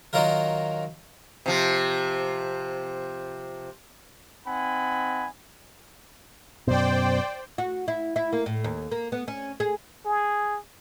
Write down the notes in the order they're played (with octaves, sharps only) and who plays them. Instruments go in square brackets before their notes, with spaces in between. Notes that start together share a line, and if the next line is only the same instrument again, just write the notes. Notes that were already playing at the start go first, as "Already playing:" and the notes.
[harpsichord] D#3 F#3 F4 A#4
[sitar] C3 F3
[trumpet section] C4 D#4 F#5 G#5 B5
[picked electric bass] F#2 B2 [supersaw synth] C5 D5 G5
[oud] F#4
E4
E4
A#3
A2
D#2
A#3
B3
C#4
G#4
[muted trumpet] G#4